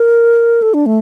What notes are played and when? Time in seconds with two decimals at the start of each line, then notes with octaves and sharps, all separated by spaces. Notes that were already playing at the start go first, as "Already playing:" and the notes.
Already playing: A#4
0.62 A4
0.74 D4
0.86 A3